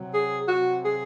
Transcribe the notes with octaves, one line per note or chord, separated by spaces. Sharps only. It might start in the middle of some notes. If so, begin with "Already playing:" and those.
Already playing: C3 F#3
G#4
C3 F#3 F#4
G#4